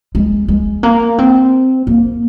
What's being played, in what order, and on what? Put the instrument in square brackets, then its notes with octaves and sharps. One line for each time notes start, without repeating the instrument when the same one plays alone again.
[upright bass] G#3
G#3
A#3
C4
A#3